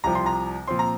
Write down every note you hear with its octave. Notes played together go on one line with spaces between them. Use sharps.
C2 C3 F3 A#5
C6
A#5
A#2 F3 C4 C6
A#5